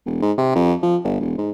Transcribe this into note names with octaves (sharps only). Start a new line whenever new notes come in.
E1
G#2
C3
F2
F3
G1
E1
G#2